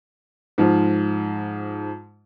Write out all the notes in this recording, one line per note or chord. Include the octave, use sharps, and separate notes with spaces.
G#2 F3